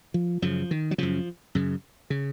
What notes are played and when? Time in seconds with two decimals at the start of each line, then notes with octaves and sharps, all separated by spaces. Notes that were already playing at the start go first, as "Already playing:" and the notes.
0.14 F3
0.42 F#2 C#3 F3
0.71 D#3
0.91 F#3
0.98 F#2 C#3 F3
1.55 F#2 C#3
2.10 C#3